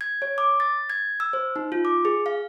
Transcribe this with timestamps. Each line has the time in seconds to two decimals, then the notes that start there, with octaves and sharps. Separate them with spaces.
0.01 G#6
0.22 C#5
0.38 D6
0.60 A6
0.90 G#6
1.20 E6
1.33 C5
1.56 D#4
1.72 F4
1.85 D6
2.05 G#4
2.26 F5